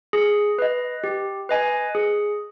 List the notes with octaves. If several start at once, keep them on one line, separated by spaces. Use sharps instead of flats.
G#4
B4 D#5
G4
B4 D#5 G#5
G#4